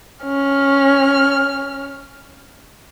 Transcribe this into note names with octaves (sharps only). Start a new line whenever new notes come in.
C#4 F6